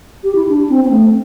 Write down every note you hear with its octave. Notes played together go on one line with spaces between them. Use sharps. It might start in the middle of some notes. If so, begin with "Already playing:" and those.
G4
E4
D4
C4
C4
A3